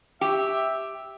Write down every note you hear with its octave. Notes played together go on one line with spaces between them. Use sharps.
G4 E5